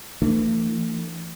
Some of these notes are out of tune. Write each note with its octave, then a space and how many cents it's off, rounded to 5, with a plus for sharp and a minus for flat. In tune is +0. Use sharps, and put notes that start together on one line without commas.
E3 +30 A3 +35 D4 +35